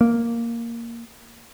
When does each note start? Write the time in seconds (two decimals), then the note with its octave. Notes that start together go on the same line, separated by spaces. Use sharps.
0.01 A#3